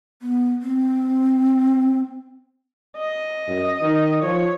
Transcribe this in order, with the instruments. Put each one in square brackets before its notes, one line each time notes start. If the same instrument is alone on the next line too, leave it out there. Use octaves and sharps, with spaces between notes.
[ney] B3
C4
[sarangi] D#5
[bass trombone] F#2
D#3
[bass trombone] F3 [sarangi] C#5